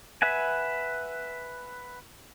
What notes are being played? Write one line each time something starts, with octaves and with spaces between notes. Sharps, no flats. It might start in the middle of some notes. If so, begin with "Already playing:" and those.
B4 E5 F#5 G#5